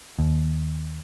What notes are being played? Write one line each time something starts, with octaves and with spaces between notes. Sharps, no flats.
D#2